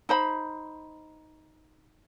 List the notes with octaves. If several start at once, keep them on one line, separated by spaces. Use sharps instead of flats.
D#4 C5 B5